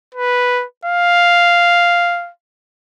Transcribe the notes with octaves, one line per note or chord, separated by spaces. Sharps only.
B4
F5